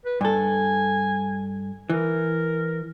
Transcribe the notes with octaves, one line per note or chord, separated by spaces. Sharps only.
B4
G2 A4 G#5
E3 A#4